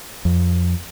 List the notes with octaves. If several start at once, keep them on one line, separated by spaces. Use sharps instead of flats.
F2